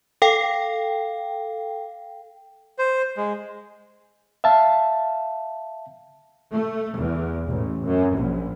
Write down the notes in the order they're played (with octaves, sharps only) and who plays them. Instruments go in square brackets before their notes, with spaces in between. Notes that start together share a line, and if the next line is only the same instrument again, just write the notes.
[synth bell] A4 F5 G5
[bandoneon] C5
G#3
[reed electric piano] E5 F5 A5
[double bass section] A3
E2
A1
F#2
A#1